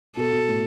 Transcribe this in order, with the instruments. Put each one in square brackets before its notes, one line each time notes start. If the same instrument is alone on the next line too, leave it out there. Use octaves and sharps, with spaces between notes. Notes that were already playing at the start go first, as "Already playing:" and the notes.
[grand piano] B2 [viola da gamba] A4
[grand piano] B2
A2